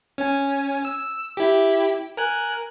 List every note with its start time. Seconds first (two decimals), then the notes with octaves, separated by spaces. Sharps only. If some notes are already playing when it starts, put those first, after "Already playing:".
0.18 C#4 G#5
0.85 E6
1.37 E4 G4
2.17 A#4 G#5 F#6